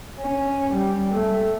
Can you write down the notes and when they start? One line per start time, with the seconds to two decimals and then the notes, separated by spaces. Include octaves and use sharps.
0.20 C#4
0.73 G3
1.14 A3